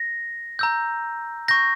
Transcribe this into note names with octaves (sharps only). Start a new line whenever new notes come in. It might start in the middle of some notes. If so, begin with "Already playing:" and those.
Already playing: A#6
A#5 E6 G6
C#6 G6 A#6